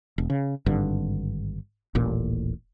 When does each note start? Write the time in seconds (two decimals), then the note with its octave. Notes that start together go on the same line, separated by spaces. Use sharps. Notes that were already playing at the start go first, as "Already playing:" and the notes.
0.18 E1
0.30 C#3
0.66 G#1 G2 D3
1.95 D#1 A1 A#2